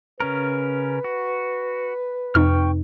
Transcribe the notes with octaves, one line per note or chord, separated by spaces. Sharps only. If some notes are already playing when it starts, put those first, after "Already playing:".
C#3 C#4 A#4 B4
F#4
F2 C3 D#4 G5 C#6 F6